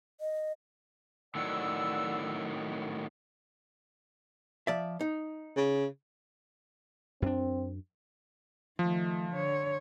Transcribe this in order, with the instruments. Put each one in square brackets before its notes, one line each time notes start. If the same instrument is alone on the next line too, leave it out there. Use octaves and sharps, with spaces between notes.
[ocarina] D#5
[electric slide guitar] A2 D#3 F#3 [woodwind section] D5 F#5 E6
[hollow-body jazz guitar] F3 D5 E5
D#4
[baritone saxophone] C#3
[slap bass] F#2 D4 [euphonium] C4
[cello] D#3 A3 [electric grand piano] F3
[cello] D3 C#5